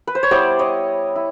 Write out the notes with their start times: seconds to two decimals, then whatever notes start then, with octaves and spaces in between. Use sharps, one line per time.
0.07 B4
0.15 C5
0.23 C#5
0.31 G3 B3 E4 C5 D5
0.59 C#5 D#5
1.16 E4